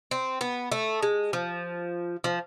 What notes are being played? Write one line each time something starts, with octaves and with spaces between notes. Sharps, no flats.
C4
B3
A3
G#3
F3
F3